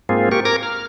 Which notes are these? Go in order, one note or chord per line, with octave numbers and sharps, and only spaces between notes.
G#2 A#3 C4 F4 G#4
G4 A#4 C#6
A#4 A#5 D6 G#6 A#6
F6